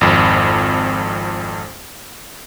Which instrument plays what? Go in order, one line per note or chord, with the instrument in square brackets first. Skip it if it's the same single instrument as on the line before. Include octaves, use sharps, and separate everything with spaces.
[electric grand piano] G#1 F2